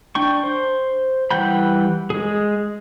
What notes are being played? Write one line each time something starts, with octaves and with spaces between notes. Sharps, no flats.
D4 G5 C#6
C5
E3 G3 F#5 G5 B5
G#3 G#4